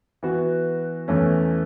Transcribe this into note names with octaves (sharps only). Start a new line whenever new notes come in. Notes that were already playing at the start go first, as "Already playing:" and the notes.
E3 B3 F#4
E2 E3 A3 C#4